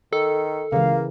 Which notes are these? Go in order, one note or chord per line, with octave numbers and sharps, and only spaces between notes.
D#3 A4
C#2 C#3 E3 A#3 F5